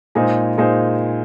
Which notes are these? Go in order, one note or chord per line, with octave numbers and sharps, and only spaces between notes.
A#2 G#3 D#4 G#4 C5
A#2 G#3 D#4 G#4 C5